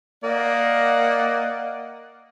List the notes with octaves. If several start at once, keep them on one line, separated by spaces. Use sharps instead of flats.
A#3 D5 D#5 F5 F#5